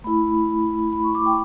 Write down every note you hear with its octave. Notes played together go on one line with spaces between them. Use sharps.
A3 E4 B5
B5
C#6
D6
G5